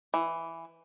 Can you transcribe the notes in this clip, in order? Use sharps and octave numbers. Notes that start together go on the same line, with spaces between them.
E3